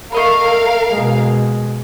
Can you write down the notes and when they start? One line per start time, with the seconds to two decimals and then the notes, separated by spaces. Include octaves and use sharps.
0.12 A3 A#4 D#5 F5 B5
0.90 B2 G#3